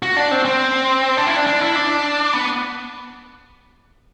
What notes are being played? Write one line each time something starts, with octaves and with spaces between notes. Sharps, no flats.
F#4
D4
C4
C4
D4
E4
D4
D4
E4
D4
B3